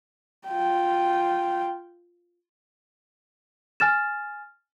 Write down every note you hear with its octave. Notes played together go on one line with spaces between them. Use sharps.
F4 G5
G#5 F6 A6 E7